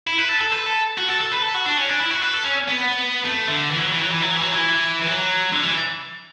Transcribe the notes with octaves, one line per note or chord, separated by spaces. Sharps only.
E4
B4
A4
A4
B4
A4
F#4
A4
A4
B4
A4
F#4
D4
C#4
D4
E4
F#4
B4
A4
C#4
B3
A3
D3
E3
F#3
E3
F#3
E3
F#3
E3
F#3
E3
E3
F#3
D3
E3